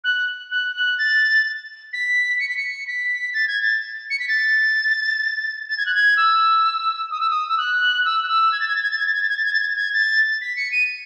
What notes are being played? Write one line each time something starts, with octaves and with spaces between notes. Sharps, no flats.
F#6
F#6
F#6
A6
B6
C#7
B6
C#7
B6
A6
G#6
A6
C#7
B6
A6
A6
G#6
F#6
G#6
E6
D#6
E6
D#6
E6
F#6
E6
F#6
E6
G#6
A6
G#6
A6
G#6
A6
G#6
A6
G#6
A6
G#6
A6
G#6
A6
G#6
A6
G#6
A6
B6
C#7
D#7